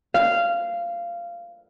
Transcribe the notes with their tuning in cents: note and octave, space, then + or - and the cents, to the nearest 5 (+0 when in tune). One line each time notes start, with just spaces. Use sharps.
F5 -15